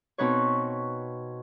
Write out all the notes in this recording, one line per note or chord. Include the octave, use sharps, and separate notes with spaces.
B2 C4 D#4 B4 C#5